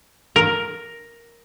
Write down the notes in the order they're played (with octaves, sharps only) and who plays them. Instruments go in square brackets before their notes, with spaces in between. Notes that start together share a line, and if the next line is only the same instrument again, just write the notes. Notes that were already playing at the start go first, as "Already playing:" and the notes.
[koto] A#4